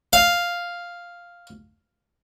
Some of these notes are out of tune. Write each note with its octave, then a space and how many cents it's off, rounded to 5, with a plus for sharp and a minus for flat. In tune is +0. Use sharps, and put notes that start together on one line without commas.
F5 +0